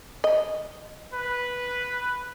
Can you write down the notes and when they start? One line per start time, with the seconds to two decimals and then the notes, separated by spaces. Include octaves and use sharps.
0.24 D#5
1.14 B4